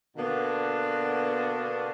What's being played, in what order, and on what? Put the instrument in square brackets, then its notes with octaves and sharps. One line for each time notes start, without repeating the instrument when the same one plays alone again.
[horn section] B2 D3 A#3 B3 D4 F#4